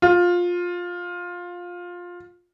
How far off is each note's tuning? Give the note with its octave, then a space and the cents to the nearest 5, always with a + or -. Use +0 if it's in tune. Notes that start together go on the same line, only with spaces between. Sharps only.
F4 +15